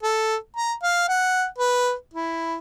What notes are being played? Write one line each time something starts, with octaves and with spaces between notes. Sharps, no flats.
A4
A#5
F5
F#5
B4
E4